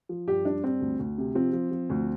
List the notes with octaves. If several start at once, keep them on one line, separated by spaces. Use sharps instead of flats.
F3
G2 G4
G2 D4
G3 C4
D2
D2
C3
F3 C4
F3
F3
D2